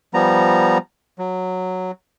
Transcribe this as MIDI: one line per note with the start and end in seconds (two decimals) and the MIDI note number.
0.14 0.78 53
0.14 0.78 55
0.14 0.78 59
0.14 0.78 82
1.19 1.91 54